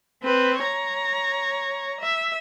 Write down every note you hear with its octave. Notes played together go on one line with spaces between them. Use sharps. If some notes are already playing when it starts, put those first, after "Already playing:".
C4 B4
C#5 A#5
E5